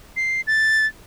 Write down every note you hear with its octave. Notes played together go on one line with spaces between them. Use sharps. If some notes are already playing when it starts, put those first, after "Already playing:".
C7
A6